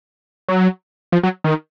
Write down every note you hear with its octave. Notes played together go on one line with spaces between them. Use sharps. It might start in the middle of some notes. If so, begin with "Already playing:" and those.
F#3
F3
F#3
D#3